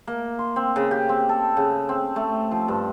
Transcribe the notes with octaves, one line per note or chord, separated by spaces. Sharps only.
A#3
C6
C4
C#3
G4
C4
A4
C#3
C4
A3
F3
G2